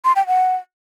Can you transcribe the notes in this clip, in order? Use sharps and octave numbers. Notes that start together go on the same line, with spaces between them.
C6
G5
F#5